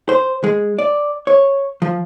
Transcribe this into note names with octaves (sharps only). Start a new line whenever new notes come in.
C5
G#3
D5
C#5
F3